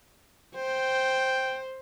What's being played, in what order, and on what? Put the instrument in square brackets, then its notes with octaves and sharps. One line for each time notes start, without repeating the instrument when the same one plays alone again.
[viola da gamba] C5 [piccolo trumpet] G5